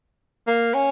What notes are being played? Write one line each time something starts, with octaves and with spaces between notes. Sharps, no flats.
A#3
C#4